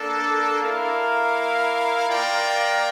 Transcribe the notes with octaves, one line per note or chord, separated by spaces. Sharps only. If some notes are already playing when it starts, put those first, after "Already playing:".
Already playing: A#3 D4 A4
A#3 E4 A#4 F5
A#3 F4 A#4 D5 G5